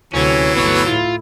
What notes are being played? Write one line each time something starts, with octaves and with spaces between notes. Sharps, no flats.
D2 C3 E3 F#3 C#4
G1 A3 B3 C#5
A2 E4 F4